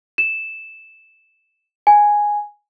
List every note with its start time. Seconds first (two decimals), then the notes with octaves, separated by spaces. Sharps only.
0.18 E7
1.87 G#5